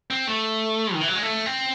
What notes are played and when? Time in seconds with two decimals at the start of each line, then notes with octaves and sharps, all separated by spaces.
0.10 C4
0.27 A3
0.94 D#3
1.01 E3
1.08 F#3
1.15 G#3
1.22 A3
1.46 C4